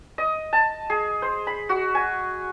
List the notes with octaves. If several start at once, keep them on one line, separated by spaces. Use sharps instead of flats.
D#5
A5
G#4
C5
B5
F#4
G#5